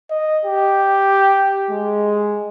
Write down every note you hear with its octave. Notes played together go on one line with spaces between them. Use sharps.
D#5
G4
G#3